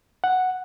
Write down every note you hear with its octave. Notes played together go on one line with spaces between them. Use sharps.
F#5